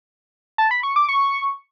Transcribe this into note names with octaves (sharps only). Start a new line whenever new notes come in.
A5
B5
C#6
D6
C#6